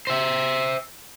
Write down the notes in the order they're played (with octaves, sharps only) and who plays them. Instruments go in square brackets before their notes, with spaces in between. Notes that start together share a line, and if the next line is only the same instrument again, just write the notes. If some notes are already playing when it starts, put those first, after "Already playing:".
[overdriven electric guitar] C5 E5